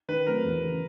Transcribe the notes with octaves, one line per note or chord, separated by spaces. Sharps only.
D#3 B4
F#3 A3 C4 E4 A#4
E2
C#3 E3